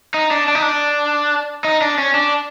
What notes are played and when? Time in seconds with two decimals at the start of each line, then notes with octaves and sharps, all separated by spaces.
0.14 D#4
0.31 D4
0.48 D4
0.55 D#4
0.62 D4
1.65 D#4
1.82 D4
1.98 C#4
2.15 D4